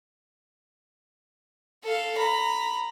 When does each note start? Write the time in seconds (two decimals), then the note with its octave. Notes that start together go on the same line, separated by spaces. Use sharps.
1.83 A4 F5
2.17 A#5 B5